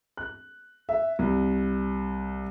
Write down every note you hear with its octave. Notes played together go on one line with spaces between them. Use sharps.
F#6
E5
C2